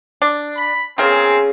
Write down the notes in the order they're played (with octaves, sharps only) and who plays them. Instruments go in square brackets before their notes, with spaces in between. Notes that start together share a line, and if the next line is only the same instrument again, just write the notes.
[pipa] D4
[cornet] B5
[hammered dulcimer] C#3 G#4 [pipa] B3 A#4 [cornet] C4